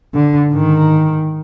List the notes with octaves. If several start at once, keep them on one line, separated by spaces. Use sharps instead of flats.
D3
G#2 D#3